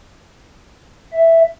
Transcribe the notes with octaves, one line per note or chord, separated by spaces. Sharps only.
E5